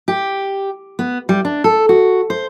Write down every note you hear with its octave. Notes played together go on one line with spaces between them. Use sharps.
G4
B3
G3
D4
A4
F#4
C5